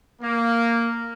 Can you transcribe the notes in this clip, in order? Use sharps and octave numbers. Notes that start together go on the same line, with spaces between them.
A#3